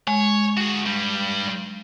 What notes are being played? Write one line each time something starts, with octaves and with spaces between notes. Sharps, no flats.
G#3 C#5
F#4 G#4
G2 G3